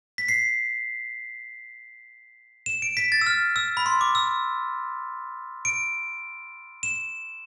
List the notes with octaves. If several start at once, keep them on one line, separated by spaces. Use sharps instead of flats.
B6
C7
E7
D7
B6
A6
E6
F6
E6
B5
C6
D6
E6
D7
E7